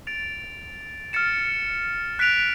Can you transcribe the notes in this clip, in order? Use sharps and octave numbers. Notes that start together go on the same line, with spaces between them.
A6 D7 F7
F6 A6 C#7 E7
F#6 B6 D7 F7